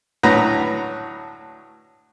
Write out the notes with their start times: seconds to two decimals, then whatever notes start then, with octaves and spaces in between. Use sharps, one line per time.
0.23 D2 A2 F#3 F#4 B4 A#5